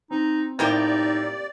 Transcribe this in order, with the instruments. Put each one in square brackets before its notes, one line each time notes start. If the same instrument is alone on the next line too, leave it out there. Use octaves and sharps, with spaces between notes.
[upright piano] C4 [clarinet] D#4
[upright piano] A2 [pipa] C3 A#3 G4 [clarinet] D#4 [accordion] D5